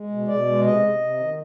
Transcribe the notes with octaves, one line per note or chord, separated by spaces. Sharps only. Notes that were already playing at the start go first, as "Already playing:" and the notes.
Already playing: G#3
B2
B2 D5
G#3
C3 D#5
C3
C3
D#3